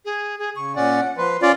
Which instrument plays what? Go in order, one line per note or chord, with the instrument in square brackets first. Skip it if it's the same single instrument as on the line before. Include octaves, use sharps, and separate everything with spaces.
[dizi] G#4
G#4
[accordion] C#3 [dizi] C#6
[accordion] A#2 C#4 D5 [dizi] F#5
[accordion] F3 B4 [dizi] C6
[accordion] C#4 [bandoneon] F4 D5